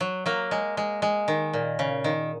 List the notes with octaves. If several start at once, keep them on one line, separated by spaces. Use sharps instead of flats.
F#3
F#3 A#3
G#3
G#3
G#3
D#3
A#2
C#3
D#3